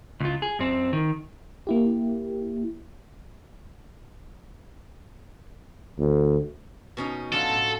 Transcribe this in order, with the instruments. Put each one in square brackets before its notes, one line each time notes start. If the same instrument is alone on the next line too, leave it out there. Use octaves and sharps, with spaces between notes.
[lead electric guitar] C#2 F4
G#4
F#2 C4
D#3
[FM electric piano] A#3 E4 G4
[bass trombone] D2
[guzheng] B2 C#4 D#4
[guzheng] F#3 D4 F4 [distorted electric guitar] A4
[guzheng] A2